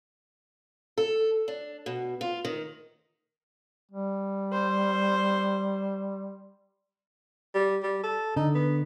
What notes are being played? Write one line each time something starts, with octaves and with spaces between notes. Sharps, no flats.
A4
D4
B2
F4
D#3
G3
C5
G3
G3
A4
D3 D#4
B3